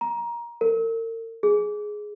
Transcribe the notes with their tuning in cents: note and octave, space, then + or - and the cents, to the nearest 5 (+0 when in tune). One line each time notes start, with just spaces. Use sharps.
A#5 +20
A#4 -40
G#4 +10